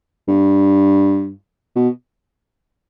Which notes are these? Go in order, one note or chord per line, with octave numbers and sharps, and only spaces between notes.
G2
B2